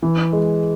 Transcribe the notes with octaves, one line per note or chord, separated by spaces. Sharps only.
E3
G#3